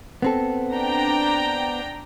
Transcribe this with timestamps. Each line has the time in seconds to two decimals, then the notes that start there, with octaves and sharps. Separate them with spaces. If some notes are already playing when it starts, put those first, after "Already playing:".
0.22 B3 C4 A4
0.73 D4 G5 A#5